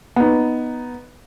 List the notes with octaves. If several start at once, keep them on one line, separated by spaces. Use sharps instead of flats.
B3 D#4